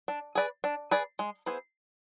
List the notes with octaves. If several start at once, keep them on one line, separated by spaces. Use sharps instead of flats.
D4
G#4 B4 D5
D4
G#4 B4 D5
G#3
B3 E4 G#4 C5